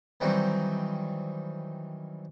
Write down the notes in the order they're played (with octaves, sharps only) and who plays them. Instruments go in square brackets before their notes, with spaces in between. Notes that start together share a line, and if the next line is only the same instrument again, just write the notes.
[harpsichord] D#3 E3 F#3 G3 C4 D#4